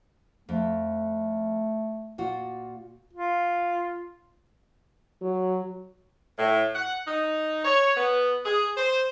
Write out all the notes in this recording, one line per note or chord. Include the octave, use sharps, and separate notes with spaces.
F2 A3
A#2 F4 F#4
F4
F#3
A2
F#5
D#4
C#5
B3
G#4
C5